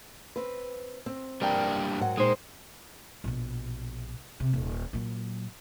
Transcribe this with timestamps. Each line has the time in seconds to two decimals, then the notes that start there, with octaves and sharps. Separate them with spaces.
0.36 C4 B4
1.06 C4
1.42 G3 A#3 D4 A#4 G5
1.98 G#2 F#3 F#5
2.17 A#2 G#3 D#4 C5
3.24 A#1 B2
4.40 C3
4.53 D#1
4.93 A#2 F#3